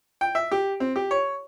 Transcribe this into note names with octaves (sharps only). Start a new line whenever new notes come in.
G5
E5
G4
C4
G4
C#5